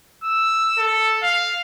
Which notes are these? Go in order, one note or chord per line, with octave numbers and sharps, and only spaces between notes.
E6
A4
F5